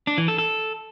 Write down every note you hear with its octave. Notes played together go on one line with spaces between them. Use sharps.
D4
E3
A4
A4